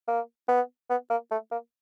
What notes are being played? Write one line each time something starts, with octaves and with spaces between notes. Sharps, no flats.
A#3
B3
B3
A#3
A3
A#3